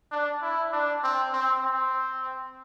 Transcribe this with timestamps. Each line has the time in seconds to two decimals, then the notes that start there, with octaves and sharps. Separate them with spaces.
0.12 D4
0.41 E4
0.72 D4
1.03 C4
1.33 C4
1.63 C4